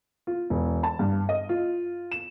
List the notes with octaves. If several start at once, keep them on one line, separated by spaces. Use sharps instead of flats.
F4
E1
A5
G2
D#5
F4
E7